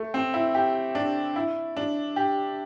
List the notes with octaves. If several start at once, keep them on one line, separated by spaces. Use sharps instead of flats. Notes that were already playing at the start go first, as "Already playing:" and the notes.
Already playing: A3
C4
E4
G4
D4
E4
D4
G4